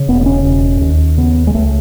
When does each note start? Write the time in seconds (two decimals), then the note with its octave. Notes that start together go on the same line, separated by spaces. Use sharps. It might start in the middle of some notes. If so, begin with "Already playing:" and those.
Already playing: C#3
0.08 E1 B3
0.21 B3
0.26 C#4
0.45 E1
0.81 D#2
1.17 C#3 B3
1.47 G#3
1.55 C#2 A3